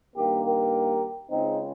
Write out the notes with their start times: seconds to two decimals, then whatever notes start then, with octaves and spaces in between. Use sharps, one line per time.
0.16 G2 D#3 A#3 G4 A#4
0.45 G4 A#4
1.31 C#2 C#3 G#3 C4 D#4